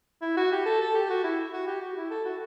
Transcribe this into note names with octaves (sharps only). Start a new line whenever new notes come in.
E4
F#4
G4
A4
A4
G4
F#4
E4
F#4
G4
F#4
E4
A4
F#4